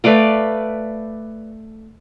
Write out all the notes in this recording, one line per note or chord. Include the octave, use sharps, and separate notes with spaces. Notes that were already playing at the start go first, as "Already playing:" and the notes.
A3 B4 D5 F5